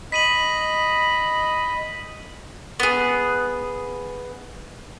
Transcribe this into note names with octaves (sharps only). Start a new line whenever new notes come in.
D#5 B5 B6 D#7 F#7
B3 G#4